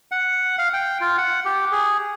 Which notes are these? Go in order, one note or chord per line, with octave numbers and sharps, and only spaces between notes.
F#5
F5
G5
F4
F#5
G4
G#4